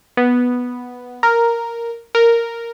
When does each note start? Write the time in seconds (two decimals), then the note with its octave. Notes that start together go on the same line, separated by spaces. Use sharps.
0.17 B3
1.23 A#4
2.15 A#4